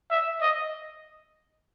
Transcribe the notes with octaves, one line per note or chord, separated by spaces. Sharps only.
E5
D#5